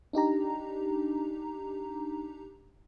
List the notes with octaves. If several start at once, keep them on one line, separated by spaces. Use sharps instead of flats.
D4 D#4 G4 A#5